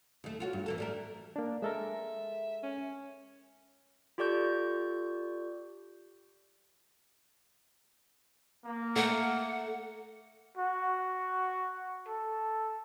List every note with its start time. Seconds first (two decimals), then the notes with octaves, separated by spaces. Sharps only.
0.24 D#2 A3
0.40 F4 F#4 C#5
0.53 G2
0.66 E3 A#3 A4
0.78 G3 A3 A#4
1.36 A#3 D4
1.62 G#3 A4 A#4 E5
2.63 C#4
4.18 F4 G4 A4 D5 C#6 G6
8.65 A#3
8.96 A3 F#5
10.58 F#4
12.08 A4